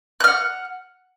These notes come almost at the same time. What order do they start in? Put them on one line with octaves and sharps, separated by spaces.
F#6 F6 F#5